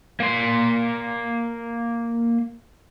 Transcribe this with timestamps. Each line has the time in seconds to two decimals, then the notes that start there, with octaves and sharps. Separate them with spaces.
0.20 A#3 C6